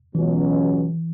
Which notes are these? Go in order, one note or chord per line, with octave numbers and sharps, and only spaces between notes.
C#2 B2 E3 F#3 C#4